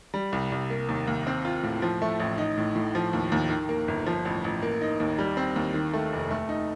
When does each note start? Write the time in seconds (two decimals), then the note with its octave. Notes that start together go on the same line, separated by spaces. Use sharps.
0.14 G3
0.32 C2
0.52 C2
0.70 A#3
0.89 D#2
1.07 D#2
1.27 C4
1.45 F4
1.63 A2
1.82 F3
2.02 A3
2.20 A1
2.38 D#4
2.58 A2
2.76 A2
2.95 F3
3.13 D#2
3.32 D#2
3.50 D#3
3.69 A#3
3.88 G1
4.06 F3
4.25 A1
4.44 A1
4.63 A#3
4.82 D#4
5.00 D#2
5.18 G3
5.37 C4
5.56 D#2
5.74 D#3
5.93 A3
6.12 F1
6.31 A3
6.49 D#4